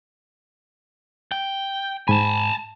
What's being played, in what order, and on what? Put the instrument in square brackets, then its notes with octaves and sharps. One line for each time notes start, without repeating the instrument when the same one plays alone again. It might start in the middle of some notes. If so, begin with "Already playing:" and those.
[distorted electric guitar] G5
[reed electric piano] G#2 B5 [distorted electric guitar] G#5 A5